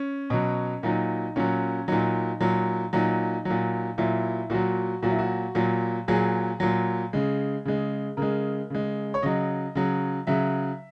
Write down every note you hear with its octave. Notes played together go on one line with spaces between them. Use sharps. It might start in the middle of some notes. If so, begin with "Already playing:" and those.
Already playing: C#4
B2 F#3
A#2 F#3 D#4
A#2 F#3 C#4
A#2 F#3 D#4
A#2 F#3
A#2 F#3 D#4
A#2 F#3
A#2 F#3 E4
A#2 F#3 F#4
A#2 F#3 F#4
E4
F#4
A#2 F#3
A#2 F#3 G#4
A#2 F#3
C#3 G#3
C#3 G#3
C#3 G#3 A#4
C#3 G#3
C#5
C#3 F#3 D#5
C#3 F#3
C#3 F#3 E5